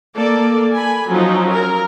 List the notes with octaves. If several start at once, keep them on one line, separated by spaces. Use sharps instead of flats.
A#3 A4 D5
G#5 B5
F3 F#3 C#4 D#4
A#4